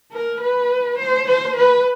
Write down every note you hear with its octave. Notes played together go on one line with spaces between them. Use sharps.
A#4
B4
C5
C5
B4